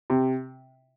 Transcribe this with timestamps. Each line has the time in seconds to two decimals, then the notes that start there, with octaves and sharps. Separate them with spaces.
0.10 C3